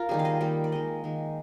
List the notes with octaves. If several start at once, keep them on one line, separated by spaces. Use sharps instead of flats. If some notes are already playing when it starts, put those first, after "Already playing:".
Already playing: F4 A#4
D#3 G3 A#3 G#4
F5
D#5
D#3 G3 A#3
D5
D#3 G#3 D#5
D#3 G#3